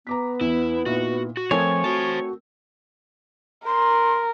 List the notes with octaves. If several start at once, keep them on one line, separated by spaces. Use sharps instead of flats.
B3 A#5 D6 B6
E2 E4
A#2 D#4 E4 F#4
F#4
F3 A3 C4 A#4 C#5 G#5
F#4 C5 A5
A#4 C6